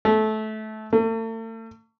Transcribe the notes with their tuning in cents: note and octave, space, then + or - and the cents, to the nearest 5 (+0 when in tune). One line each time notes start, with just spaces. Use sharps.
A3 -20
A3 +40